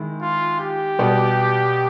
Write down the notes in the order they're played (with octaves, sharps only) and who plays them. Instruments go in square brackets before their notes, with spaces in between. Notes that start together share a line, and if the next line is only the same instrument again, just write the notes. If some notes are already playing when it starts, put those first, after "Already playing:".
Already playing: [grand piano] D#3 G#3 E4
[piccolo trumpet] F4
G4
[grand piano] B2 G3 B3